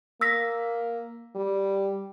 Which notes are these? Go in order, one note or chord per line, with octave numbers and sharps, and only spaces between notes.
A#3 E6 A#6 B6
G3